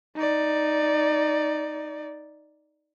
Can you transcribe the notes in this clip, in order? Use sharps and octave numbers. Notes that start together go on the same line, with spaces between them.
D#4 D5